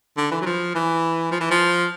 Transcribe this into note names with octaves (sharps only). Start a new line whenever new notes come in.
D3
E3
F#3
F3
E3
F3
E3
F3